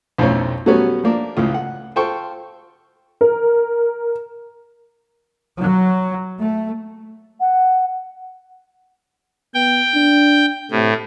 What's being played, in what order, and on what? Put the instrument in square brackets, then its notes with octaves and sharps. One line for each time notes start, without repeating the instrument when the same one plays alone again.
[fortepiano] B1 F2 A2 A3 C4 C#4
F#3 G3 A3 B3 C#4
F3 A3 A#3 D4
C#2 A2 C#3 F4
F#5
F4 A4 C5 G5 C#6
[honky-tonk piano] A#4
[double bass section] F#3
A3
[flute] F#5
[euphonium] B3 [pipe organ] G5
[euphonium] D4
[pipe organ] A2 [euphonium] C3